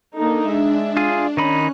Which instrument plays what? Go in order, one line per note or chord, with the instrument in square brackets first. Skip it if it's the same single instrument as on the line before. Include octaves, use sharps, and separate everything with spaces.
[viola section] A#3 D#4 A4 [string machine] D4
[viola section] G#3 E5
[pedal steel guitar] F4 G#4
[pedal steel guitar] D#3 D#4 B5 [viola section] C#4 [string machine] F#6